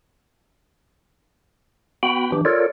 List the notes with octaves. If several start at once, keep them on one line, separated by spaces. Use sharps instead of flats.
B3 F#4 G5 B5
E3 D4 G4
F4 A4 A#4 C#5 D5